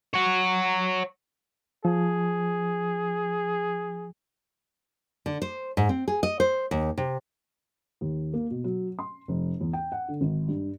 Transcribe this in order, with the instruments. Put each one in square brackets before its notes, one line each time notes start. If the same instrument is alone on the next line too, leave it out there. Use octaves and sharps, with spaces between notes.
[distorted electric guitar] C#5 F#5
[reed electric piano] F3 [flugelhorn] G#4
[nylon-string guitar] D3
C5
G#2
C4
G#4
D#5
C5
D#2
C3
[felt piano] D#2
A#3
B2
F#3
C6
F1
E2
G5
F#5
D3
G#1
G2